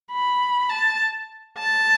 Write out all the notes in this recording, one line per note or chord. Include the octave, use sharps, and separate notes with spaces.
B5
A5
A5